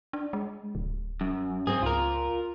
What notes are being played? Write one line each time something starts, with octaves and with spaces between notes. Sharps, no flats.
D4
G#3
D1
F#2
G#2 C4 G#4
C#2 F4 A#4